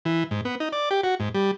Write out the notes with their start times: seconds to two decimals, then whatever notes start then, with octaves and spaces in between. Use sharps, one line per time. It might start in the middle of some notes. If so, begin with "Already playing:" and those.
0.05 E3
0.31 G#2
0.45 B3
0.60 D#4
0.72 D5
0.91 G4
1.04 F#4
1.20 G#2
1.35 G3